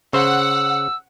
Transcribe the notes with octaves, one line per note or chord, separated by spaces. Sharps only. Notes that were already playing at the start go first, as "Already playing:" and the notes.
C#3 C5 F#5 E6